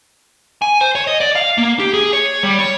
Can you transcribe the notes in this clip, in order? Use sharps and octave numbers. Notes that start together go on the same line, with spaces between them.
G#5
C5
C#5
D#5
D5
F5
A#3
G4
G#4
C#5
G3
C#5